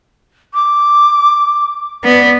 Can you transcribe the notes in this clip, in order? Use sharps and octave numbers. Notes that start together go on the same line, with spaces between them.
D6
B3 D5